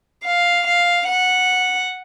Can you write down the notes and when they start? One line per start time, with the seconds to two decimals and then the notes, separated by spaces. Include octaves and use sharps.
0.26 F5
0.67 F5
1.08 F#5